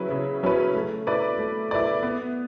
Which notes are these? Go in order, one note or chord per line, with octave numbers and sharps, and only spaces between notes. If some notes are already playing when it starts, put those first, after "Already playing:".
Already playing: C#3 F#3 C#4 E4 B4
C#3
F#3 C#4 E4 B4
A3
E4 B4 D5
A3
E4 B4 D5
B3